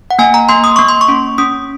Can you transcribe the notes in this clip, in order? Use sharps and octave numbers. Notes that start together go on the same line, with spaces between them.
F#5
A#3 G#5
A#5
A#3 C6
D#6
A#3 C#6
C6
C#6
C#4
C#4 D#6